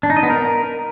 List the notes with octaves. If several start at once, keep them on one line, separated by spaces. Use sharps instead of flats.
D4
D#4
D#5
B3
A#4